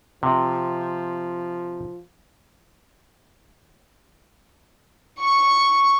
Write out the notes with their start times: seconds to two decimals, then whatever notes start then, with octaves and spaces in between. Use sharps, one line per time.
0.23 C3 F3
5.20 C#6